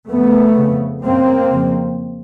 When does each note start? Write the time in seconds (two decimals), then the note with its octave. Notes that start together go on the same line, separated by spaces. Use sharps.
0.10 F2 C#3 A3 B3
0.57 F2 C#3
1.04 F#2 C#3 A#3 C4
1.51 F2 C#3